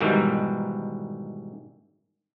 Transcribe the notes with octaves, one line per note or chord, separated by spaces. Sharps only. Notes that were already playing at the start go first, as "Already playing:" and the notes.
G#2 B2 D#3 E3 G3